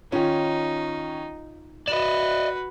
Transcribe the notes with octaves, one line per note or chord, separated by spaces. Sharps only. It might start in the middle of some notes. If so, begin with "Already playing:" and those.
D#3 C#4 D#4 F4 G#4
F#4 B4 D5 D#5 E7